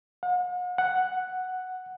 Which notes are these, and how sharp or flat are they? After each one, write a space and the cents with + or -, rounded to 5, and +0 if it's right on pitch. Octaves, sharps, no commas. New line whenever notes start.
F#5 -45
F#5 +0